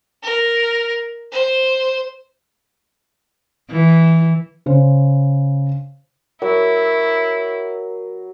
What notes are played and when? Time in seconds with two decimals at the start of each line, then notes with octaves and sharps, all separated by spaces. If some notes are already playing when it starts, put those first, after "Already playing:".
0.23 A#4
1.32 C5
3.71 E3
4.66 C#3 C5
6.42 F#3 E4 A#4